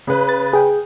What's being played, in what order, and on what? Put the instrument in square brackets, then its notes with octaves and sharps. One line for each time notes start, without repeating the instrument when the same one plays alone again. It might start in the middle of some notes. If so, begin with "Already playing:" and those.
[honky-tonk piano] C#3 B4
[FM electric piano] A6
G#4 G5